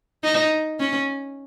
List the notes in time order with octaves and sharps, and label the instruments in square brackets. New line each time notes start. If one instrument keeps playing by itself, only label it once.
[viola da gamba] D#4
C#4